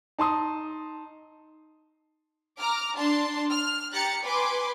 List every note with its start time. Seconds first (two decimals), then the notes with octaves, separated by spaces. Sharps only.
0.19 D#4 A5 C6 D#6
2.59 A#5 D6 F6
2.96 D4 A5 C6
3.50 F6
3.93 G4 A#5 F#6 A6 C#7
4.24 B4 G#5 C6 D6